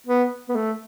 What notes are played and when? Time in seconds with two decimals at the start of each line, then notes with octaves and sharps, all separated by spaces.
0.07 B3
0.49 B3
0.55 A3